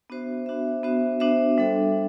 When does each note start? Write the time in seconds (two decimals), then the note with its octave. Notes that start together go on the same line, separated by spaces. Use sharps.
0.10 B3 D4 F#4 C5 E5
0.46 B3 D4 F#4 C5 E5
0.83 B3 D4 F#4 C5 E5
1.20 B3 D4 F#4 C5 E5
1.58 G3 D4 A4 E5